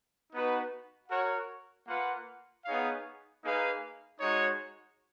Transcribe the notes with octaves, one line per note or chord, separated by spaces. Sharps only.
B3 D#4 F#4 B4
F#4 A#4 C#5 F#5
A#3 F4 B4 F#5
B3 D#4 G#4 C#5 F5
A#3 D#4 G#4 B4 F5
G#3 D#4 F#4 C#5